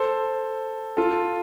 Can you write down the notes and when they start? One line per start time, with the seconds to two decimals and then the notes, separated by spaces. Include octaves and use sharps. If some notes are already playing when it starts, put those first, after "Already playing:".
Already playing: A4 C5
0.97 F4 A4